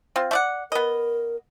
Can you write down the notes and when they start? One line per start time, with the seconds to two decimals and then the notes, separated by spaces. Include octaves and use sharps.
0.16 C4 F4
0.31 A3 D5 F#5
0.72 B3 A#4 D#5